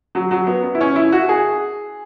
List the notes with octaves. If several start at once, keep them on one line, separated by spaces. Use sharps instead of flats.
F#3
F#3
B3
B3
E4
C#4
E4
F#4
G#4